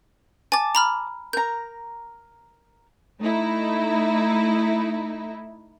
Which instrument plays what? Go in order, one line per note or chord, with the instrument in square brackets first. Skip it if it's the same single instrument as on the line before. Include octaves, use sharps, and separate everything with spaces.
[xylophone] G#5 A6 [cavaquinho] A5 D6
[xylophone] A#5 B5 F6
[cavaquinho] A#4 A#5 [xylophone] G6
[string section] A3 D#4 E4